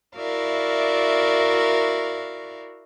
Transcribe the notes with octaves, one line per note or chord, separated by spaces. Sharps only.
E4 F#4 A#4 D5 E5 F5